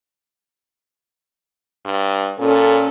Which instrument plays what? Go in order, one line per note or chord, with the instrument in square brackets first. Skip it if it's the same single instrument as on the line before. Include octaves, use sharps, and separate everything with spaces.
[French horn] G2
[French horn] A#2 [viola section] C#4 A4